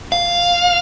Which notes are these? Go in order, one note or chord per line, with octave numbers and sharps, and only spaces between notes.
F5